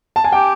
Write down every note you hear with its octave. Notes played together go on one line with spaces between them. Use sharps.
A5
G#5
G4 G5